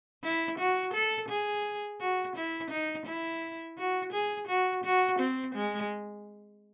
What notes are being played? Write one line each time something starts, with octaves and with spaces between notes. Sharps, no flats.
E4
F#4
A4
G#4
F#4
E4
D#4
E4
F#4
G#4
F#4
F#4
C4
G#3